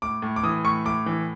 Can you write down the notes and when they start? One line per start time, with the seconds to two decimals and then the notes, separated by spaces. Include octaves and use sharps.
0.02 A2 D6
0.22 A2
0.36 D6
0.43 E3 D#6
0.64 A2 C#6
0.85 A2 D6
1.06 E3